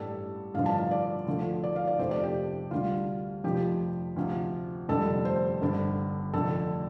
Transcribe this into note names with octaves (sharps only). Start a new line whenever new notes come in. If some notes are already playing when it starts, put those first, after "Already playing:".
Already playing: A1 G2 G3 A4
A1 G2 D3 F3 F5
A5
F5
D5
D2 D3 F3 A3
D5
F5
D5
F1 F2 C3 A3 C5
D5
G4
D2 D3 G3 F4
F1 F2 F3 G4
D2 C3 F3
F1 F2 D3 G3 A4
C5
G1 G2 D3
F1 F2 D3 A3 A4